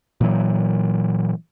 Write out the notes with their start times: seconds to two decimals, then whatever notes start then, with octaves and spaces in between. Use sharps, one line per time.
0.21 A#2 E3 F#3